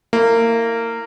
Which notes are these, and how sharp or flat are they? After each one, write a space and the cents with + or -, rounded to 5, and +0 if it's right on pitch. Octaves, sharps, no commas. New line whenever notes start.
A#3 -25 E4 +0